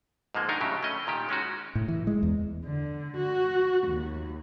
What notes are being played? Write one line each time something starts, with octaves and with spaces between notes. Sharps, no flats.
G#2 F3 G#3 A#3
D#3 D4 D#4 A#4
A2 C#3 F#3 G4
A3 C#4 D#5
A#2 D#3 G4
G#3 C#4 D#4 F#4
A2
E3
G#3
E2
D3
F#4
D#2